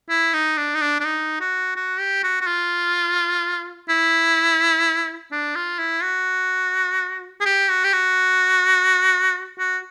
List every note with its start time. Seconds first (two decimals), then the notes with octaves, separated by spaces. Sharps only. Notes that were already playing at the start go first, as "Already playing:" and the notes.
0.10 E4
0.34 D#4
0.57 D4
0.75 D#4
0.81 D4
1.00 D4
1.04 D#4
1.41 F#4
1.76 F#4
1.99 G4
2.23 F#4
2.41 F#4
2.47 F4
3.89 E4
5.32 D4
5.55 F4
5.79 E4
6.03 F#4
7.41 G#4
7.45 G4
7.69 F#4
7.84 G4
7.93 F#4
9.59 F#4